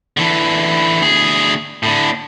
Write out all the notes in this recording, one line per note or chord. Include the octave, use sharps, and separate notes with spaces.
D3 E3
D2 G#4
A2 D3